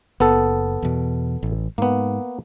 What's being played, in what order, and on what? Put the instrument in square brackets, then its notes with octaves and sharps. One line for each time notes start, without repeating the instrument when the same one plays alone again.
[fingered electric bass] F#1 [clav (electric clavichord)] B3 A4
[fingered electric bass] E2 B2
A1
[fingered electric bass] G#2 [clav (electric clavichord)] A#3 B3